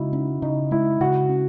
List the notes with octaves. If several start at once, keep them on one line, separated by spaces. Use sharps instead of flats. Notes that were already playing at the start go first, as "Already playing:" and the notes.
Already playing: C#3 G#3 D#4 E4 F#4
C#4 D#4
C#3 D#4
G#3 E4
C#3 F#4
C#4